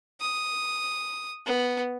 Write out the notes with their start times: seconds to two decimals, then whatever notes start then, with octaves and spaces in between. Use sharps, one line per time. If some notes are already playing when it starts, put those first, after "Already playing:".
0.21 D#6
1.46 B3